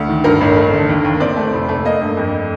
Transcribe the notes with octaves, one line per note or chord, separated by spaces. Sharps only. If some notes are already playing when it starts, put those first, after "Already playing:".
Already playing: D2 D5
D#3
G2 A#4
A1
A3
D3
D#2
D#2
C4 D5
A3
F1
A3
A#3 D#5
G2
F2